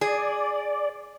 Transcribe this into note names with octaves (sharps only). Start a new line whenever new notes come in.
G#4 D5